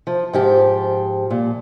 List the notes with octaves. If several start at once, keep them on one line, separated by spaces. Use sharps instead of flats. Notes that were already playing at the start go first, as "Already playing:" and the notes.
F3
G#2 F3 G4
A#2